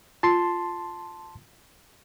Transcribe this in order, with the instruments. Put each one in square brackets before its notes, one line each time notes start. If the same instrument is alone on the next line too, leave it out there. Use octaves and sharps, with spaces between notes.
[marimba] F4 [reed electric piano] A5 C6